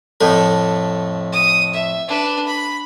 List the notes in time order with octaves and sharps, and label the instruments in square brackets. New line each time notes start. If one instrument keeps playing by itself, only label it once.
[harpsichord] F2 A2 A3
[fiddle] D#6
E5
D4 B4
B5